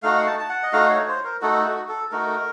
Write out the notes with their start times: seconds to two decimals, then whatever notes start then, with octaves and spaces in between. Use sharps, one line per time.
0.03 A3 D#4 F#4 F5
0.18 F#5
0.27 A5
0.39 A5
0.49 F#5
0.63 D#5
0.73 A3 D#4 F#4 F5
0.89 C#5
1.08 C5
1.25 A#4
1.41 A3 D#4 F#4 A4
1.65 F#4
1.89 A4
2.11 A3 D#4 F#4 A#4